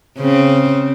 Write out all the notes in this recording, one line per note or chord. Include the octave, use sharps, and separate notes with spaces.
C#3 C4